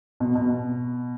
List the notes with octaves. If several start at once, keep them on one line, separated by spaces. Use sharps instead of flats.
B2
B2